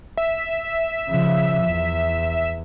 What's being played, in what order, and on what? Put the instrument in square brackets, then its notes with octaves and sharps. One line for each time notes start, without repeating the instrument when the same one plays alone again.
[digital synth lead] E5
[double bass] C#3 F3
E2